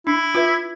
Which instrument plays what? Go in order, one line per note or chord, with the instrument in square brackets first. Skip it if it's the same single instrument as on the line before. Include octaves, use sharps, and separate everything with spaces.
[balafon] D4 [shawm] E4
[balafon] F4 B4 E5